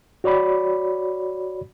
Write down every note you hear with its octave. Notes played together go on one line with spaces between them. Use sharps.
F#4 C#5 D5 B5